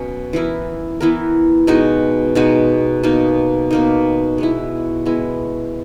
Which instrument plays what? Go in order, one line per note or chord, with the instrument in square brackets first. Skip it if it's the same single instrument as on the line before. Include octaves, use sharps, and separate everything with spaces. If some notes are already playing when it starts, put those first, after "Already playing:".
Already playing: [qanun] B2 F#3 C#4
E3 B3 E4 A#4
E3 B3 E4 A#4
B2 G#3 D#4 F#4
B2 G#3 D#4 F#4
B2 A#3 D#4
B2 A#3 D#4
G#3 B3 E4
G#3 B3 E4